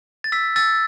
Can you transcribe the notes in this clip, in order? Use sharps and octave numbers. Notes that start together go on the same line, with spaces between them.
A6
E6 B6
E6 A6